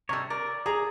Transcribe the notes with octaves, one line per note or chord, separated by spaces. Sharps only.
C3 G3 A4 A#4 C#5
A#4 D5
G#4 A#5